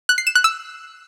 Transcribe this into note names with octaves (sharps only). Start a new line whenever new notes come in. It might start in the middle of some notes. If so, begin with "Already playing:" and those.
F#6
C7
E7
F#6
E6